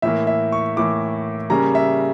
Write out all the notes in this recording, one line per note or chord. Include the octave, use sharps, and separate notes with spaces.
A2 E3 A#3 E5
E5
C#6
A2 E3 A#3 D6
C#3 G3 A#3 A#5
E5